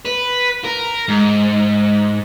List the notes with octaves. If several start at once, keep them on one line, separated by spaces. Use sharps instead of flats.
B4
A#4
G#2